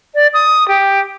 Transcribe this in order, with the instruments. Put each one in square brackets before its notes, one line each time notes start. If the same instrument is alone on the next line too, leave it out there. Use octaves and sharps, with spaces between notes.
[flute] D5
D#6
G4